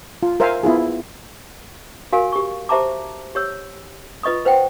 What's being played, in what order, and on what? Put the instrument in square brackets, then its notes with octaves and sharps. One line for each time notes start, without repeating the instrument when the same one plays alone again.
[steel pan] F4
A#4 C5 E5 F5 G#5
B3 E4 F4 G#4
[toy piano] F#4 A#4 F5 G#5
G4 C#6
G4 C5 E5 A5 A#5 D6
G4 C#5 E6
F4 B4 D#5 C#6 D#6
B4 C5 F#5 G5